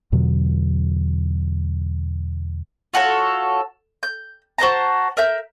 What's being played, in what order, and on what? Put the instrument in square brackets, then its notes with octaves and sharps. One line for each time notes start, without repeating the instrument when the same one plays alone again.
[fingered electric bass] E2 B2 D3 F#3
[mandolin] F4 F#4 A4 C#5
G6
F#4 C5 A5 A#5
A#4 E5 G6